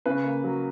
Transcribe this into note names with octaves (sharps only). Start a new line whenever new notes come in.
C#3 B4
A#3
F#3